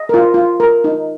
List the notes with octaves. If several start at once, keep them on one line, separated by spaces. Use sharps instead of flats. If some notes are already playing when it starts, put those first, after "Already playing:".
Already playing: D#5
F4 A#4
F4
A#4
D#4